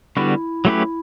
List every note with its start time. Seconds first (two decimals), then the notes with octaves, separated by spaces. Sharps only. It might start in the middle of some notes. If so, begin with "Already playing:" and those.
0.17 D3 G3 B3 E4 F#4
0.65 F#3 A3 C#4 G4 B4